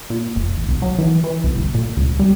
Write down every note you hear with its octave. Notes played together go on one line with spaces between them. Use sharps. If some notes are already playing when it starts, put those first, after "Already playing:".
A#2
F1
A1
C2
F#3
E3
E3
C2
G1
A#2
C#2
G3